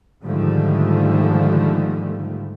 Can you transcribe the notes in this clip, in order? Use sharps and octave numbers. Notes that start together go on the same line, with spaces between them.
G#2 D3 D#3 F3 G3 A3